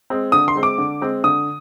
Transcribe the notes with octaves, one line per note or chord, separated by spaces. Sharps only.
G#3 C4
D3 D#6
C6
G#3 C4
D6
D3
G#3 C4
D3 D#6